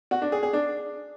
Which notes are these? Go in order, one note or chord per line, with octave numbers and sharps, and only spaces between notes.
F#4
D4
G#4
G#4
D4